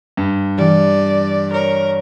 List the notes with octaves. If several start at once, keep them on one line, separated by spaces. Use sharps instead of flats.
G2
E3 G3 D5
A#4 C#5